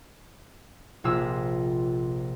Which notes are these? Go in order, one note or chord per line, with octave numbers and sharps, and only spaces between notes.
A#1 C3 F4 G#4 E6